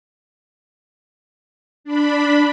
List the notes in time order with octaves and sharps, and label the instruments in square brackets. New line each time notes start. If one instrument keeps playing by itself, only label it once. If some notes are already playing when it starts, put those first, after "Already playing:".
[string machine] D4 B5